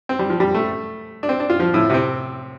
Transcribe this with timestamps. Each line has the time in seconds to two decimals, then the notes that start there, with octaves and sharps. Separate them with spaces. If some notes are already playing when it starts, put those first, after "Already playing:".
0.09 C4
0.19 G3
0.30 F3
0.40 G3
0.55 A3
1.23 D4
1.29 C4
1.40 D4
1.50 F4
1.60 F3
1.74 A2
1.90 C3
1.94 C4